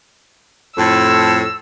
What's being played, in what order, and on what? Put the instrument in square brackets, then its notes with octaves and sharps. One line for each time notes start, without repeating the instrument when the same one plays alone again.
[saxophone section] F2 A2 [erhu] E6